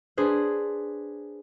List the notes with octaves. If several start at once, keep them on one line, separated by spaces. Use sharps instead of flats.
D4 G#4 B4 C5